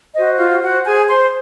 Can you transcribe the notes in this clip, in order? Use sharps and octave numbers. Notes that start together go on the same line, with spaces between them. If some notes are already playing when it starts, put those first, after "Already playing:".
F#4 C5 D#5
F4 F5
F#4 F#5
G#4 G#5
C5 C6